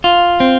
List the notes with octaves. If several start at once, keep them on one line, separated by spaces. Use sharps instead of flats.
F4
C4